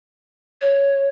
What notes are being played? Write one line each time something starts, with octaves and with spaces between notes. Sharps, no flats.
C#5